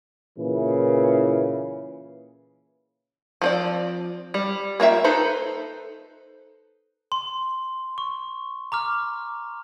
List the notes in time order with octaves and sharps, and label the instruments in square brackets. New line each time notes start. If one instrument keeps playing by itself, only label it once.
[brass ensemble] A#2 C#3 E3
[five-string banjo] F3 C4 D5
G3
A#3 F4 F#4 E5 G5
D#4 A4 B4 C5
[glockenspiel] C6
C#6
A#5 D6 F6